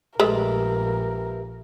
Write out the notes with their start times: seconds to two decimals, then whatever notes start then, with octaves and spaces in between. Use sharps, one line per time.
0.20 A#1 G#3 A3 G4 A#4 B4 E5